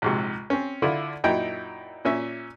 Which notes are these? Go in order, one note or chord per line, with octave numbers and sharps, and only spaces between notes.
A#1 G#2 C3
C4 C#4
D3 E4 F4
F#2 A#2 D#4 E4 G5
A#2 C#4 E5